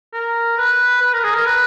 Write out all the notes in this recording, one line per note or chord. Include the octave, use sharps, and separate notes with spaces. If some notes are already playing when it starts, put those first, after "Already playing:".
A#4
B4
B4
A#4
G#4
A#4
B4